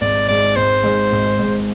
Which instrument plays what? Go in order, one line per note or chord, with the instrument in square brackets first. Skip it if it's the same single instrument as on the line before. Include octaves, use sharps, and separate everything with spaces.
[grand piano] G#1 [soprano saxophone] D5
[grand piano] G#2 G#3 [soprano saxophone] D5
[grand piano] G#1 [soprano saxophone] C5
[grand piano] G#2 G#3
G#1
G#2 G#3